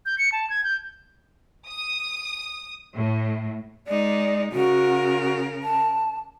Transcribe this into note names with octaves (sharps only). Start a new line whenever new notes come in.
G6
C#7
A5
G#6
G6
D#6
A2
G#3 D#4 D5
C#3 F#4 A#4
A5